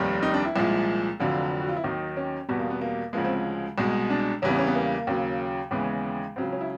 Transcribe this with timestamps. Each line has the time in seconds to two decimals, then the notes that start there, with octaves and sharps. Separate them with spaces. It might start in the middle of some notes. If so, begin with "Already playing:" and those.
Already playing: F1 D#2 D#3 G3
0.23 D#4
0.34 D4
0.45 E4
0.56 C2 A#2 F3 G#3
1.20 F1 F2 D3 F#3 F4
1.61 F#4
1.68 F4
1.77 E4
1.84 D#2 D#3 F#3 D#4
2.17 C#4
2.48 E2 B2 G3 B3
2.59 A#3
2.70 B3
2.81 A#3
3.13 D2 C#3 F3 G#3 A#3
3.25 C4
3.78 C2 B2 G#3
4.10 D4
4.42 E2 C#3 E3 G3 C#4
4.50 B3
4.59 C#4
4.67 B3
4.75 A#3
5.07 D#2 C#3 F#3
5.71 D#2 C#3 E3 G#3 B3
6.36 C#2 C#3 F#3 C4
6.53 C#4
6.61 E4